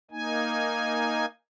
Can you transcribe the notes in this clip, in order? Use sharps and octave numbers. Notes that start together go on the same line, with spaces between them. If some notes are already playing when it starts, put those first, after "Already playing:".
A#3 D#4 G#5